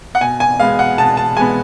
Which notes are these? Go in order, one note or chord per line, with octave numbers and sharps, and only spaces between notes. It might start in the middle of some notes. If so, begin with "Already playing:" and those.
F#5
B2 G#5
G#5
G#3 B3 F5
F#5
B2 A5
A5
G#3 B3 G#5